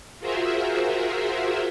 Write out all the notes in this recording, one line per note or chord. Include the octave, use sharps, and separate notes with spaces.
F4 F#4 G#4 A#4 C5 E5